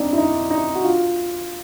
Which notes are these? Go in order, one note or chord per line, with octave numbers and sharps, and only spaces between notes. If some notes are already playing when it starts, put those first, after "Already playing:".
Already playing: C4 D4 D#4
E4
D#4
D#4
F#4
F4